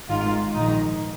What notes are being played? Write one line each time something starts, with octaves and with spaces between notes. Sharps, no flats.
G#1 G#2 D#3 F4
A#1 G#2 D#3 D#4